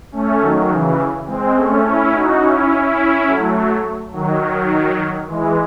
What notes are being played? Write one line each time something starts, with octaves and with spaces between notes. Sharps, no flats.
A3 C#4
D#3 F#3
C#3 E3
G#3 C4
A3 C#4
C#4 E4
D#4 F#4
C#4 E4
C#4 E4
F#3 A3
D#3 F#3
E3 G#3